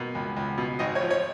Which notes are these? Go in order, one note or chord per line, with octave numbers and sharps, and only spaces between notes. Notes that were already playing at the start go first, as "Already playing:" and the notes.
Already playing: B2 A#3
C#2
C#2
B2
G#1 D#5
C#5
F3
C#5